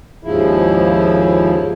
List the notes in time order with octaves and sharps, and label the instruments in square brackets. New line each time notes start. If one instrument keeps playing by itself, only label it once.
[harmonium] D#2 G#2 C#3 F3 E4